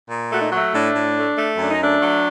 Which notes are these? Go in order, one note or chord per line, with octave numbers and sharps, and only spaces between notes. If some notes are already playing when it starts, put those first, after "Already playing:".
A#2
A3 F#4
D#4
F#3 A3 F#4
A2 D4
A2
A3
A3
F#2 D4
D#4
A3 D4
F#3